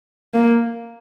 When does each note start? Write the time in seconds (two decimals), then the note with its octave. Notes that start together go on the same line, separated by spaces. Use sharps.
0.34 A#3